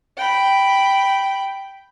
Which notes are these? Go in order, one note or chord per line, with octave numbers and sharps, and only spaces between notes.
G5 B5